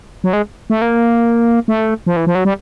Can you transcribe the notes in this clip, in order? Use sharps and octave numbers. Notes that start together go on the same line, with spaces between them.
F#3
G#3
A3
A#3
A3
F3
E3
F3
F#3
G3